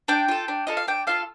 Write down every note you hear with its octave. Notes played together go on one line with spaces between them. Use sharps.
D4 G5
F4 A4
D4
F4 A4 D#5
F5
D4 G5
F4 A4 F5